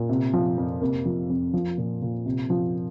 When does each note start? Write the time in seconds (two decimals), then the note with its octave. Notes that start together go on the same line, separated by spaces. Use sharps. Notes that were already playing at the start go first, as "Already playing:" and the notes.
Already playing: A#2
0.09 C3
0.33 F3
0.57 F2
0.81 C3 A#3
1.05 F3
1.30 F2
1.53 F3
1.78 A#2
2.02 A#2
2.26 C3
2.50 F3